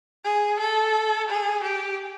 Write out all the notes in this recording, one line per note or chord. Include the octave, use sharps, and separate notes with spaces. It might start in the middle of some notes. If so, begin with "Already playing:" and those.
G#4
A4
G#4
G4